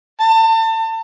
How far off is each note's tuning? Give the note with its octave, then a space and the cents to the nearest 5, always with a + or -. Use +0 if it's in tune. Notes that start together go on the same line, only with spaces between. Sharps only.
A5 +35